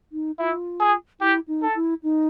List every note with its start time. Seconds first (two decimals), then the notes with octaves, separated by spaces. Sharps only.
0.12 D#4
0.39 E4 F4
0.80 G#4
1.20 E4 G4
1.48 D#4
1.62 A4
1.75 E4
2.03 D#4